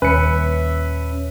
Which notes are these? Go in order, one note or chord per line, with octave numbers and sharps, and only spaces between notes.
D#1 C#4 B4 E5 C#7